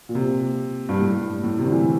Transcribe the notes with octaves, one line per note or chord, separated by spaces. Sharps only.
A#2
C3
G2
A2
A2
C3
D3
E3